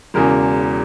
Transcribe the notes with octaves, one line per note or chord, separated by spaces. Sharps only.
E1 E2 C#3 A#4